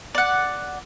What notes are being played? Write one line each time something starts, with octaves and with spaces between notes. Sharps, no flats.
D5 F#5